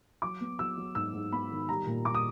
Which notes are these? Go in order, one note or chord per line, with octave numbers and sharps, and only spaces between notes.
F#3 D6
B3
F#3 E6
F#3
G#2 E6
G#2
B3 B5
D#3
G3 A#5
A#2
G3 D6
D#6